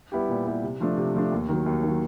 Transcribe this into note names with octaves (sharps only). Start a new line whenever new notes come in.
G3 B3 E4 G4
A#2
G3 B3 E4 G4
C3
F3 A3 D4
C3
F3 A3 D4
D#2
D#3 F#3
D#2
D#3
F#3